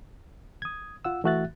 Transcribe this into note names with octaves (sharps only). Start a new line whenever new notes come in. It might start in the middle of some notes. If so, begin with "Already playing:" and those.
D#6 G#6
F4 F#5 E6
E3 A3 F#4 E5 F#6 A6